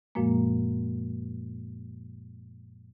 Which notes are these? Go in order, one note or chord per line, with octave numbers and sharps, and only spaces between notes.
F#2 A#2 F3 G#3 A#3